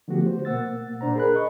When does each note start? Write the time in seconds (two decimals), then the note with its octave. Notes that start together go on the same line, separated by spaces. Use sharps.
0.08 D3 F3 A3 B3 F#4 G4
0.26 C5
0.45 B2 A#3 F#5 E6 A6
1.01 A#2 D4 C5 A#5
1.16 G#4 A#4 B5 F#6
1.35 D#5 C#6